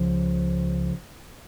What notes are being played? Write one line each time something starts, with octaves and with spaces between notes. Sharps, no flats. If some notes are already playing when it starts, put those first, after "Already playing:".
Already playing: C#2 C#3 F3